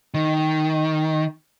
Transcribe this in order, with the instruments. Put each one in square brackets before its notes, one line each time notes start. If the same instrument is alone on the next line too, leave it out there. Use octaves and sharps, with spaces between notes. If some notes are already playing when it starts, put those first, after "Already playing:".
[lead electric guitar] D#3